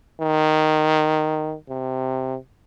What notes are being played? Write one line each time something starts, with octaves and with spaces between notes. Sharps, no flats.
D#3
C3